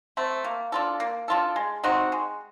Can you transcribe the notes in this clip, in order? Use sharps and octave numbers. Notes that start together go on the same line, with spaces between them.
A3 C4
A#3
D4 F4 A4
A#3
D4 F4 A4
G#3
C4 D#4 F#4
G#3